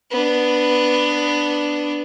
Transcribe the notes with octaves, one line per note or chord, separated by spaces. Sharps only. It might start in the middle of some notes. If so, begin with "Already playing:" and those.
B3 D4